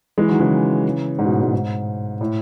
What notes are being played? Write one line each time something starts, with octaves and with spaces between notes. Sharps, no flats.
E3 G#3
D#3 F#3
C#3 E3
G#2
B2
A2
G#2 B2
G#2
A2